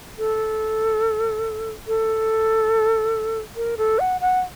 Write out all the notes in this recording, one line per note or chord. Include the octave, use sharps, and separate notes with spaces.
A4
A4
A#4
A4
F#5
F#5